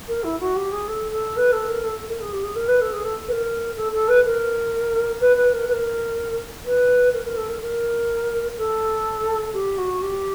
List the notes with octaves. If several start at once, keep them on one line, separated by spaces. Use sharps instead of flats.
A#4
E4
F#4
G4
G#4
A4
A4
B4
A4
A#4
A4
A#4
G#4
G4
G#4
A#4
B4
A4
G#4
A4
B4
A#4
A4
A4
B4
A#4
B4
B4
A#4
B4
A#4
B4
A#4
A#4
A4
A#4
A#4
A4
G4
F#4
G4